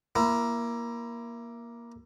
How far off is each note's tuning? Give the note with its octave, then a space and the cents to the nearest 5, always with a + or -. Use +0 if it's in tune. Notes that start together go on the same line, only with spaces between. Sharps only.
A#3 +15 E4 +30